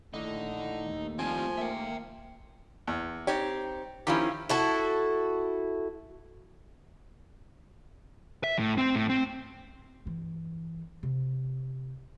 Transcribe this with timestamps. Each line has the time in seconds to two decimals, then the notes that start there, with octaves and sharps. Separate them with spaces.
0.14 A#1 A2 D3 D#3 A3 D#4
0.86 D#2
1.19 F3 G3 C4 G#5
1.58 A#3 E5 G5
2.87 E2
3.27 C4 D#4 G4 C#5
4.07 D#3 F3 C#4 E4 F4 G4
4.49 E4 F#4 A4
8.44 E5
8.59 A2
8.78 C4
8.96 A2
9.09 C4
10.05 G2 E3
11.03 C3